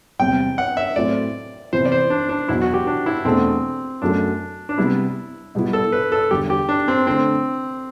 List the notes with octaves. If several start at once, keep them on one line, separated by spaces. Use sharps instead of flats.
E2 C3 G3 C4 G5
F#5
E5
A2 F#3 A3 C4 E4 D5
C3 E3 B3 E4 C5
D5
C5
D4
D4
E2 B2 F#3 E4
F#4
G4
D4
E4
E2 B2 A3 C4 D4
F#2 F#3 A3 D4
D4
C3 G3 B3 E4
B2 G3 B3 E4
A4
B4
A4
E2 D3 G3 G4
G4
D4
C4
D3 A3 C4 D4